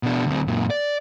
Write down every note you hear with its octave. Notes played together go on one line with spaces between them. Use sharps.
B2 D4
D2 C4
F#2 A#2
D5